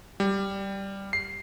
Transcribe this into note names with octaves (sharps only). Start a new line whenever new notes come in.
G3
C7